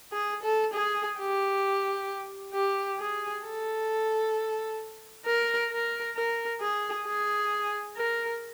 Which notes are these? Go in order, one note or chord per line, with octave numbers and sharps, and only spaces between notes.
G#4
A4
G#4
G4
G4
G#4
A4
A#4
A#4
A#4
G#4
G#4
A#4